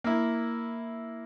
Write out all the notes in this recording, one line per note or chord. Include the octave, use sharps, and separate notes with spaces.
A#3 E4